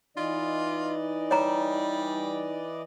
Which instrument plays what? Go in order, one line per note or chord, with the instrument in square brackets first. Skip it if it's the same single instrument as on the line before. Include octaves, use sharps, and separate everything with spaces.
[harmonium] E3 D5 D#5 [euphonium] D#4 [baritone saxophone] F4
[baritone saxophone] G3 [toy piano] C#5 A#5